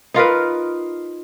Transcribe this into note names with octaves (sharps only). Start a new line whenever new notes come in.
D#4 F4 A#4 B4